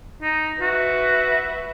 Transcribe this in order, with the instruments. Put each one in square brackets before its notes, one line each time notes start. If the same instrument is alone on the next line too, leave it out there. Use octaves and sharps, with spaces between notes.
[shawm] D#4
[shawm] F#4 [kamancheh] B4 E5